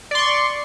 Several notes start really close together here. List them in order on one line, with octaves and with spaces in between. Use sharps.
D5 C6 C#6